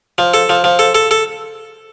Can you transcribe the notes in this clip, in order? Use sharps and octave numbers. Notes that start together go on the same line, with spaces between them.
F3
A4
F3
F3
A4
A4
A4